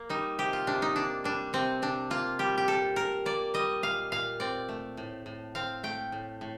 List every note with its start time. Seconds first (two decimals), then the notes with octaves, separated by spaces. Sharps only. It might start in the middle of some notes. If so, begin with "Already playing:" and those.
Already playing: A#3
0.09 G3 D#4
0.39 C3 G4
0.53 F4
0.67 C3 D4
0.82 D#4
0.96 A#3 D4
1.24 G3 D4
1.53 C3 C4
1.82 C3 D4
2.10 A#3 F4
2.39 G3 G4
2.58 G4
2.68 A#2 A4
2.96 A#2 A#4
3.26 A#3 D5
3.54 G3 D#5
3.83 A#2 F5
4.12 A#2 F5
4.40 C4 D5
4.69 A3
4.97 A2
5.26 A2
5.55 C4 F5
5.83 A3 G5
6.12 A2
6.41 A2